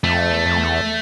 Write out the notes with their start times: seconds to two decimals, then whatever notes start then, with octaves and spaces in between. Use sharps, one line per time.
0.03 F2 A3
0.31 E2
0.46 F2
0.58 E2